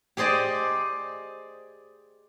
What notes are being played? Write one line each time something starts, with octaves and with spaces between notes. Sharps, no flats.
G4 G#4 C5 D5 D#5